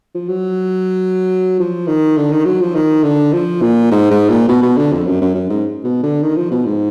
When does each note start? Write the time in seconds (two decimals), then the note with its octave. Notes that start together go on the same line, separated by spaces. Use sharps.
0.15 F3
0.29 F#3
1.60 F3
1.88 D#3
2.17 D3
2.32 D#3
2.45 F#3
2.61 F3
2.75 D#3
3.03 D3
3.33 F3
3.62 A#2
3.91 G#2
4.10 G#2
4.29 A#2
4.49 B2
4.63 B2
4.77 D3
4.92 F2
5.06 F#2
5.21 F#2
5.35 F#2
5.49 G#2
5.84 B2
6.03 D3
6.22 D#3
6.36 F3
6.51 B2
6.65 G#2